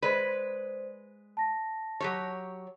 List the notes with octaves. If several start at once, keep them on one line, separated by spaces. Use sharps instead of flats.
G#3 B4 C5 D5
A5 A#6
F#3 G4 C#5